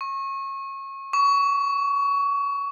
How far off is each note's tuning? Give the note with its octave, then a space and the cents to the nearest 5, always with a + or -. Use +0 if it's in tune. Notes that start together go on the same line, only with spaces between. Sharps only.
C#6 -30
C#6 +25